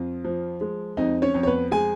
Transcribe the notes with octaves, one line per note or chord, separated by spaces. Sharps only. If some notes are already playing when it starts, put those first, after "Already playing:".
Already playing: F2 F4
F3
G#3
F2 D#4 D#5
C#4 C#5
F2
C#5
B3 B4
G#3 G#4 G#5